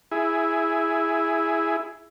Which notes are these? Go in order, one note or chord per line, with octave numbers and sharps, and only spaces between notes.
E4 G#4